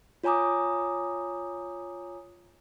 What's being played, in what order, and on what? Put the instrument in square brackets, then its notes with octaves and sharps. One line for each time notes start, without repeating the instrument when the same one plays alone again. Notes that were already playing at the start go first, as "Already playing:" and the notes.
[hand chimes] F4 C#5 G#5 A#5 D6 D#6